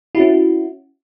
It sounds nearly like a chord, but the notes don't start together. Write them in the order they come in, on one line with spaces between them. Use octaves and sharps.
E4 F#4 C#4